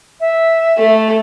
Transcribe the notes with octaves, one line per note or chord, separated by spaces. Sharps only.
E5
A3